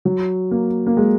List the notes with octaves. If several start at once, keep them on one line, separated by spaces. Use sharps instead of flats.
F#3
A#3
A#3
G#3